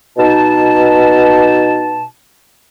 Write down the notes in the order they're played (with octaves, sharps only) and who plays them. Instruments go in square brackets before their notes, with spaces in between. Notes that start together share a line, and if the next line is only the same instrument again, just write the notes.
[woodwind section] B2 D#4 A5